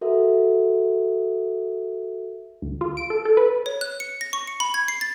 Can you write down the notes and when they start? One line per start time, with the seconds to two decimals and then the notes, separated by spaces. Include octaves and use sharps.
0.01 F#4 A4 A#4 E5
2.62 D2
2.81 F4
2.97 D7
3.10 A4
3.25 A4
3.37 B4
3.66 C#5
3.81 F#6
4.00 C#7
4.21 A#6
4.33 C#6
4.47 C#7
4.60 B5
4.74 G#6
4.88 C7
5.01 A6